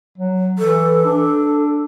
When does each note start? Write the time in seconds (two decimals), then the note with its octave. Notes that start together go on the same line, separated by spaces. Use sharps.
0.18 F#3
0.59 E3 A4
1.05 D4